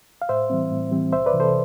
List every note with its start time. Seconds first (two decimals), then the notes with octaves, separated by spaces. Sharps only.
0.22 F5
0.29 A2 C5 E5
0.50 E3 G3 C4
0.71 A2
0.91 E3 G3 C4
1.13 C2 C5 E5
1.26 B4 D5
1.33 C3 E3
1.40 A4 C5